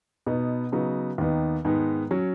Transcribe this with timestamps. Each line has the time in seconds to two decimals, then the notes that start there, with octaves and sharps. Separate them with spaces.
0.26 B2 B3 D#4
0.72 C#3 F#3 B3 D#4
1.18 D#2 D#3 B3 D#4
1.65 G#2 D#3 G#3 B3
2.11 F#3 C#4